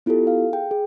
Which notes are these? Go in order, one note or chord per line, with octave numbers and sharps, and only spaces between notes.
B3 E4 F4 G4 A4
F5
G#4 G5
G#4